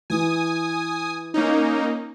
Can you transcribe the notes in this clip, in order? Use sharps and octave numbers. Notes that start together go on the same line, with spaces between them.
E3 G#5 D#6
A#3 C#4 D#4